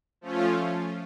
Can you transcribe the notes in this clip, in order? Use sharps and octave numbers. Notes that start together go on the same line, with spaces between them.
F3 A3 C#4 F4